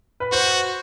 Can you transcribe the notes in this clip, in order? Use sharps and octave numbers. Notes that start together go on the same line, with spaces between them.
B4
F#4 C5